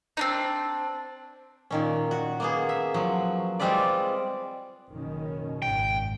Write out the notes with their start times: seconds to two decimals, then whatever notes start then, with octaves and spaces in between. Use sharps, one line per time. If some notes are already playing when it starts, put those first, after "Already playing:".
0.17 C4 D4 D#4
1.71 A#2 D#3 C#4
2.11 F#4
2.40 A#3 B3 G#4
2.69 E5
2.94 F3 F#3
3.59 G3 G#3 C4 F4 B4 D5
4.89 F#1 B2 D#3 C#4
5.62 G#1 F#2 G5